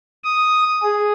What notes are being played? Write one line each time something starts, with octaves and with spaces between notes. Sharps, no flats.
D#6
G#4